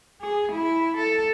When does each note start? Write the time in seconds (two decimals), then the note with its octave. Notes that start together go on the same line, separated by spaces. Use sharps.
0.21 G#4
0.51 E4
0.97 A4